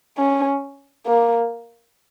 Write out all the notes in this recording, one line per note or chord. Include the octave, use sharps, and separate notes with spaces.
C#4
A#3